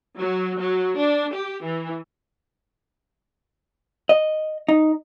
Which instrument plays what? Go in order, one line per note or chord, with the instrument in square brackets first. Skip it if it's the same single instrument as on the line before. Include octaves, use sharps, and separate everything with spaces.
[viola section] F#3
F#3
D4
G4
E3
[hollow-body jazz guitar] D#5
D#4